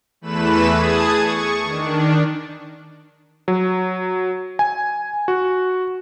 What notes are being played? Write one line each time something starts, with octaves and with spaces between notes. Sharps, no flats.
E2 E3 A3 B4 B5 E7
G#4 A5 D#6 G#6
C#6
D#3 D4
F#3
G#5
F#4